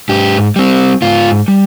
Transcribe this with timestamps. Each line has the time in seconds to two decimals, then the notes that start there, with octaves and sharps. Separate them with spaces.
0.09 G#2 G4
0.56 G3 C4
1.02 G#2 F4
1.48 G3